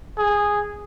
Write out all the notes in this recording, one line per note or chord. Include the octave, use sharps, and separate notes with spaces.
G#4